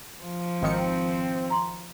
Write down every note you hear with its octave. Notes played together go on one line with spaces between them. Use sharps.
F3
G#1 D#3 C4 C#7
A#5 C6